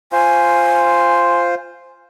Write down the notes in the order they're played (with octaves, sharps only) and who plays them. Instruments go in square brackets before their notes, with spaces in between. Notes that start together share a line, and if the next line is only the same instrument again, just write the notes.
[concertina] F4 C5 [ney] G#5